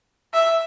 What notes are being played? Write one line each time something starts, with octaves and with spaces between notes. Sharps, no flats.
E5